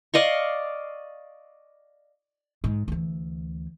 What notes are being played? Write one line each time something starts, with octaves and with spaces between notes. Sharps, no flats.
D5 D#5 F5 C#6
G#2
D2 E3